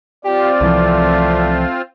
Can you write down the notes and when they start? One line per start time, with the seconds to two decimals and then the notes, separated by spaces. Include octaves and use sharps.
0.25 C4 F4 G4 D5
0.61 C2 E3 F3 A3